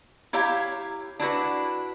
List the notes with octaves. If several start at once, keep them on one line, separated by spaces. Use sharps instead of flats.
E4 G4 C#5 F5 A#5
D4 E4 F#4 B4